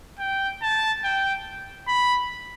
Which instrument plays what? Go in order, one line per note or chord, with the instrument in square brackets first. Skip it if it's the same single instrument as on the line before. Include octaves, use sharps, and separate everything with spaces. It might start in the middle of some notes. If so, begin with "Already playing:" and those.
[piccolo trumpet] G5
A5
G5
B5